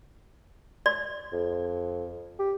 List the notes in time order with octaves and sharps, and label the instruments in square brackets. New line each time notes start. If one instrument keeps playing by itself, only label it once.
[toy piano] D5
[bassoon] F2
G4